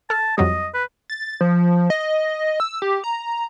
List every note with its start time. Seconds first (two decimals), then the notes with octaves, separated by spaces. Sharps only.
0.10 A4 A5 F6
0.38 F2 F#3 G3 D#5
0.74 B4
1.10 A6
1.41 F3
1.90 D#5
2.60 E6
2.82 G4
3.04 A#5